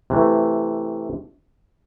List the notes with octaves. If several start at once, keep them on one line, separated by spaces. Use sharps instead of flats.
C3 E3 A3